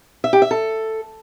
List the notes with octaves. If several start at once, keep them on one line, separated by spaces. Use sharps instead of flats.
E5
G4
E5
A4